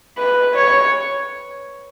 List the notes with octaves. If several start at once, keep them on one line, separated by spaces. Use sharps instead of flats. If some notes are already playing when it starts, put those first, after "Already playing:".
B4
C#5